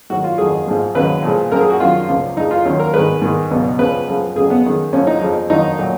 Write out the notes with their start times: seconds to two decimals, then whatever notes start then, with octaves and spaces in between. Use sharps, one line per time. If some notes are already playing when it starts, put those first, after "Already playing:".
0.10 G#2 D#3 F#3 F#4
0.24 F4
0.38 F2 D#3 F#3 G#4
0.67 G#2 F3 G#3
0.95 D#2 C#3 F#3 B4
1.23 A#2 F3 G#3
1.52 F#2 F3 G#3 A#4
1.61 G#4
1.70 F#4
1.80 F#2 D#3 F#3 F4
2.08 C#2 C#3 F3
2.37 F2 F3 G#3 D#4
2.51 F4
2.65 D#2 D#3 F#3 C#4
2.79 A#4
2.93 G#2 D#3 G#3 B4
3.22 G#2 D#3 G#3
3.51 C#2 B2 F#3
3.79 C#2 C#3 F3 G#3 B4
4.08 F#2 F3 G#3
4.35 F2 C#3 F#3 G#4
4.50 B3
4.65 F#2 D#3 G#3
4.93 F#2 C#3 F3 C#4
5.07 D#4
5.21 F2 F3 G#3
5.50 F2 D#3 F#3 D#4
5.78 A#2 F#3